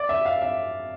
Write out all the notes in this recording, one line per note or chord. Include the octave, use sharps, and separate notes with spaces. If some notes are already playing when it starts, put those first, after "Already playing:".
Already playing: D5
E5
F5
E5